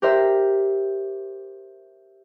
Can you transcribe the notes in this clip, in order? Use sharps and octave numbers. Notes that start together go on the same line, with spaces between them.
G4 A#4 C5 E5